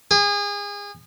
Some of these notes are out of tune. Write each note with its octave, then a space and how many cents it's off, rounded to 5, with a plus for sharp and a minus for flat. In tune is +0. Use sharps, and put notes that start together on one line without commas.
G#4 -30